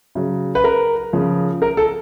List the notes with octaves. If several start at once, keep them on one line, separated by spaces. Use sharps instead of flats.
C#3 F#3
B4
A#4
C#3 F3
A#4
A4